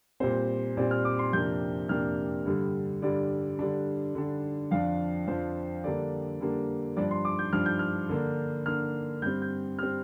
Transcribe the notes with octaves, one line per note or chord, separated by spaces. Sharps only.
A#2 G3 C4 C5
A#2 G3 C4 D5
F6
D6
C6
F2 C3 A#3 D4 G6
F2 C3 A#3 D4 F6
G2 D3 G3
G2 D3 G3 D5
D3 G3 D4
D3 G3 D4
F2 F3 D4 F5
F2 F3 D4 C5
D3 G3 A#3 D4 D5
D3 G3 A#3 D4
G2 F3 D4 D5
C6
D6
G6
G2 F3 D4 F6
G6
F6
D3 A#3 D4
D3 A#3 D4 F6
G2 G3 C4 G6
G6
G3 C4 F6